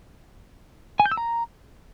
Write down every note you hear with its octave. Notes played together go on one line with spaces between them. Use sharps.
G#5
G6
E6
A#5